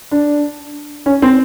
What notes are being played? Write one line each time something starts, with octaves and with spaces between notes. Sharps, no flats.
D4
C#4
C4